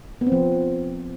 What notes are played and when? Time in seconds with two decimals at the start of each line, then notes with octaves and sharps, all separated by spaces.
0.21 B3
0.27 C4
0.32 F3